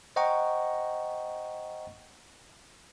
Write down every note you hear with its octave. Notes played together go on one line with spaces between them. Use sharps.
C5 D#5 F#5 G5 A#5 C#6